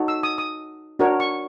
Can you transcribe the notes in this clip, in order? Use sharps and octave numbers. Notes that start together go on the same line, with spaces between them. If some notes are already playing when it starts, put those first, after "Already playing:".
Already playing: D#4 F#4 A4 C#5
E6
D#6
D#6
D4 F#4 A#4 C#5
C#6